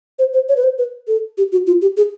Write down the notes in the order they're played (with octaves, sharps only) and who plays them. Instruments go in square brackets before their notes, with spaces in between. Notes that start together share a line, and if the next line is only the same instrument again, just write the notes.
[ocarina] C5
C5
C#5
B4
C5
B4
A4
G4
F#4
F4
G4
G#4